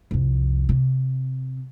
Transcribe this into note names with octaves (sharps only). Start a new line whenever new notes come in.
C2 F2
C3